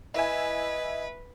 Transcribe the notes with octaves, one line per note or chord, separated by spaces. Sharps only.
E4 B4 D#5 E5 G#5